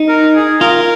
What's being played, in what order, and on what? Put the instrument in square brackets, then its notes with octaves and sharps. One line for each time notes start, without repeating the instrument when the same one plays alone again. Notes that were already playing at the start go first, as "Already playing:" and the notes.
Already playing: [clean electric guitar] D#4
[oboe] A#4
G#4
[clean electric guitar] F4 [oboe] A#4